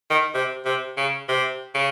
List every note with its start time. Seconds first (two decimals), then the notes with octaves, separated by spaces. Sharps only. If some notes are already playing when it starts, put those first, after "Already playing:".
0.10 D#3
0.34 C3
0.65 C3
0.97 C#3
1.29 C3
1.75 C#3